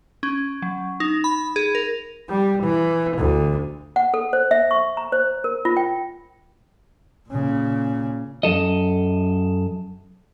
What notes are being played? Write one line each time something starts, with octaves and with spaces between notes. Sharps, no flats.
C#4
F#3
D#4
B5
G#4
A#4
G3
E3
D2
F#5
A4
C5
E5
C#6
A#5
C5
A#4
F4
G5
A#2 C#3
F#2 A4 D#5